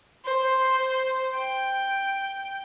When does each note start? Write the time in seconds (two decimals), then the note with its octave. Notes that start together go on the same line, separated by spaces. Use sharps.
0.25 C5
1.36 G5